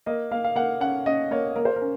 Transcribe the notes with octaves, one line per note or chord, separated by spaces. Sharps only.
A#3 D#5
A#3 F5
F5
A#3 F#5
C#4 F#5
C#4 D#5
A#3 C#5
A#3 A#4
C5
A#4
C#4